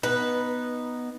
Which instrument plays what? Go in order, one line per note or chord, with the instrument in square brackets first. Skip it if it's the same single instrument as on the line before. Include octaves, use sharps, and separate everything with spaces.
[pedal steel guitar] B3 D#4 [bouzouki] B4